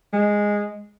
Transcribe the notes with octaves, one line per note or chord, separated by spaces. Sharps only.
G#3